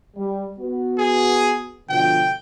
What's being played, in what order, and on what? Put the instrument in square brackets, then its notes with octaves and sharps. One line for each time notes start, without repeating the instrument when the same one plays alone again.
[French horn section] G3
B3 F#4
[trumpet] G#4
[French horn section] B2 D3 F3 [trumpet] G5